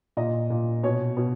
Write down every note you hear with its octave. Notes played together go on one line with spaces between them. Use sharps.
A#2 D#5
A#2
B2 C#5
B2